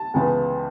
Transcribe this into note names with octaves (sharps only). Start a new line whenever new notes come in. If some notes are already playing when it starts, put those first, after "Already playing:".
Already playing: A5
C#2 C#3 E3 B3